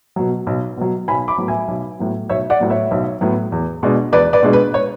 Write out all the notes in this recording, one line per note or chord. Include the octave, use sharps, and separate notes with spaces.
B2 F#3
B1
B2 F#3
B1 G#5 B5
B5 D6
A2 F#3 B3
E5 G#5
B1
A2 F#3 B3
B1 C#5 E5
D5 F#5
A2 F#3 B3
C#5 E5
B1
A2 F#3 B3
E2
B2 G#3 D4
E2 B4 D5
B4 D5
B2 G#3 D4
B4
C#5